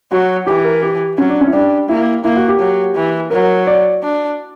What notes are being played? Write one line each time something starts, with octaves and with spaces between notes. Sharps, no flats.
F#3 F#4
E3 G4
A#4
G4
F#3 C#4
D4
C#4
E4
G3 D4
A#3 E4
A#3 E4
F#4
G4
F#3
E3
F#3 A#4
D5
D4